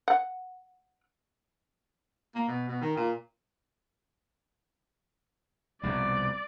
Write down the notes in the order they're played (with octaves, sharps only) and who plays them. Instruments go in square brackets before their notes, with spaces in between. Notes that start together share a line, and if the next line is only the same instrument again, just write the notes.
[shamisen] F#5
[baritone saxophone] A#3
B2
B2
D#3
A#2
[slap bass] C2 F2 B2 [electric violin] D5